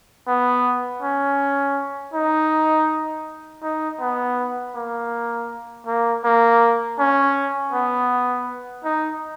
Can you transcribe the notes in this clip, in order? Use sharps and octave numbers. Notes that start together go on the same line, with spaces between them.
B3
C#4
D#4
D#4
B3
A#3
A#3
A#3
C#4
B3
D#4